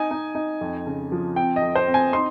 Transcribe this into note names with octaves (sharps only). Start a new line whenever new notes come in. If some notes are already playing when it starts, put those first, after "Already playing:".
Already playing: D#4 G#5
D#4
D#4
F2
C#3
F3
C4 G5
D#5
F2
C5
C4
G#5
D#4 C6